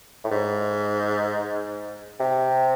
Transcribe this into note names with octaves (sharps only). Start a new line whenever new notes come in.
A2
G#2
C3